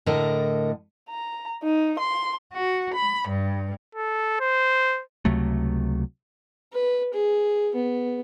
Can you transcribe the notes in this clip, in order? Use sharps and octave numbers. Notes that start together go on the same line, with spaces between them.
A2 D3 A4 A#4 D#5
A#5
D#4
C6
F#4
B5
G2
A4
C5
C#2 C3 F#3 A3
B4
G#4
B3